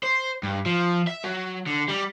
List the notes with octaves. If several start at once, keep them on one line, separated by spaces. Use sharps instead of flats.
C5
G2
F3
E5
F#3
D3
G3